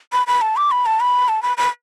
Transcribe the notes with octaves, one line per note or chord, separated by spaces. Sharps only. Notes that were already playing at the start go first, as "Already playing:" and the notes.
B5
B5
A5
D6
B5
A5
B5
A5
B5
B5